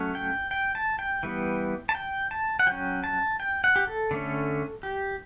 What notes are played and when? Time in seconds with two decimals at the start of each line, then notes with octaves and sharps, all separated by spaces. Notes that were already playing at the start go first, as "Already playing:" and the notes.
Already playing: F#3 A3 C#4
0.15 G5
0.51 G5
0.75 A5
0.99 G5
1.23 E3 G3 B3
1.89 A5
1.95 G5
2.31 A5
2.59 F#5
2.67 F#3 C#4 G5
3.04 A5
3.40 G5
3.64 F#5
3.76 G4
3.87 A4
4.11 D3 A3 C#4
4.83 G4